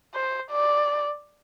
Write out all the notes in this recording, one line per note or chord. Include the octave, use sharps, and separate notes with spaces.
C5
D5